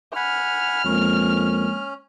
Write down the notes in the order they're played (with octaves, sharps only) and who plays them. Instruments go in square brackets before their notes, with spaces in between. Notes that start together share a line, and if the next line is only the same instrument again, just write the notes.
[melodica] F#5 G#5 B5 [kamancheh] F6
[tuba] F2 [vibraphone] G#3 A#3 A#4 [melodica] C#4